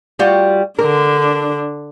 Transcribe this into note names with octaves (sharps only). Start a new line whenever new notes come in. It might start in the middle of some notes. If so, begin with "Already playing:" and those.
G3 F4 F#4
D3 D4 A#4